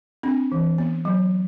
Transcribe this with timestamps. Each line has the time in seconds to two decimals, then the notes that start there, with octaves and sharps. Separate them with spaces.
0.23 C4 D4
0.52 E3
0.78 B3
1.05 F#3